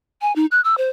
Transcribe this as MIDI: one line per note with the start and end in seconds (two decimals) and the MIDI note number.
0.22 0.35 80
0.36 0.46 63
0.52 0.61 90
0.64 0.77 88
0.78 0.90 72